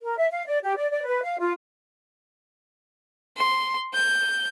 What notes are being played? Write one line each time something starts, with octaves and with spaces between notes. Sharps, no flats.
A#4
E5
F5
D5
G4
D5
D5
B4
F5
F4
C6
G6